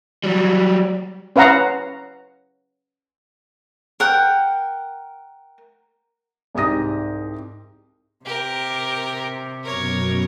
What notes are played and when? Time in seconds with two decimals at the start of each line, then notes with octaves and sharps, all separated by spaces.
0.24 F#3 G3
1.36 C#4 B4 F5 F#5 A#5
4.00 A#4 F#5 G5
6.55 C2 G#2 G4 D#6 A#6
8.25 C3 G4 A#4
9.64 F#2 B2 A#4 C#5